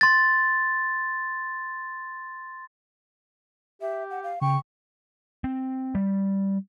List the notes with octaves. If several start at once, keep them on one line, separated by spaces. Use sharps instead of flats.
C6 A6
G4 E5
F#5
F5
C#3 G5 C#6
C4
G3